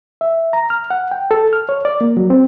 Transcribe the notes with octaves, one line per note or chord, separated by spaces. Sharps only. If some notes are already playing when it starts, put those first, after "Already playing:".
E5
A#5
F6
F#5
G5
A4
F6
C#5
D5
A#3
F#3
C4